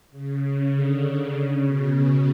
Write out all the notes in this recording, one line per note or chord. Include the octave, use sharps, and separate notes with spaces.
C#3
D3
C#3
B2
C#3